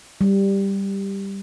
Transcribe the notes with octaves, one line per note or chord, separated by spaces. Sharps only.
G3